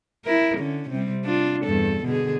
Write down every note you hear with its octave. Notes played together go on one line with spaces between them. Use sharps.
E4 A#4
D3 C#4
C3 G3 C4
D4 F4
E2 G2 A4
B2 D3 G#4